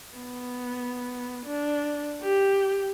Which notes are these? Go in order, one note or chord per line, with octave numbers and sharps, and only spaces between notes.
B3
D4
G4